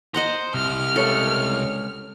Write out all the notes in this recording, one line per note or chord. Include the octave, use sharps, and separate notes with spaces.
C5 D#5 F#5 A#5
C2 F6
C#2 A4 C#5